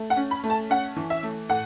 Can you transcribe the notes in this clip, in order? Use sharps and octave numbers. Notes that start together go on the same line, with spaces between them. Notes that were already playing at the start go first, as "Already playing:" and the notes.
Already playing: A3
F#5
C#4
B5
A3
A5
C#4 F#5
E3
E5
A3
A2 F#5